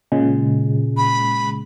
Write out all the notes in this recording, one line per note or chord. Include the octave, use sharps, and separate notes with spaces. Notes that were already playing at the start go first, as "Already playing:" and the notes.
A#2 C#3 G#3
B5